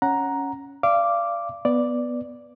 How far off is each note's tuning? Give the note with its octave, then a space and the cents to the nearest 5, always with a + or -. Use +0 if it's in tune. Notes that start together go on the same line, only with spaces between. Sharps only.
C#4 +0 F#5 +0 A#5 +10
D5 +0 F5 -30 D6 +0
B3 +0 D5 +0